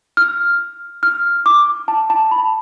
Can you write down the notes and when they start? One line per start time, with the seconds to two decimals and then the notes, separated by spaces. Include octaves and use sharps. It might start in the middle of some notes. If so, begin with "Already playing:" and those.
0.17 F6
1.03 F6
1.46 D6
1.88 A5
2.10 A5
2.31 B5
2.38 A5